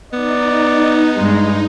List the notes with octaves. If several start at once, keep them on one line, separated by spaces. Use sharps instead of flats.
B3 D#4 D5
G2 G#3